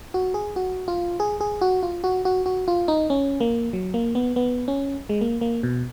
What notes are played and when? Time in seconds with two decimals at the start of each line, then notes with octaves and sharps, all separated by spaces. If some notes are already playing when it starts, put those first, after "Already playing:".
0.14 F#4
0.34 G#4
0.56 F#4
0.88 F4
1.20 G#4
1.41 G#4
1.61 F#4
1.83 F4
2.04 F#4
2.25 F#4
2.46 F#4
2.68 F4
2.88 D#4
3.10 C#4
3.41 A#3
3.73 F#3
3.94 A#3
4.15 B3
4.36 B3
4.68 C#4
5.09 G#3
5.21 A#3
5.41 A#3
5.63 B2